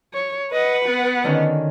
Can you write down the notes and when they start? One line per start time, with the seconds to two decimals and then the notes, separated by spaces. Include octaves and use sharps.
0.13 C#5
0.52 B4 D#5 F#5
0.85 B3
1.24 D3 D#3 C#4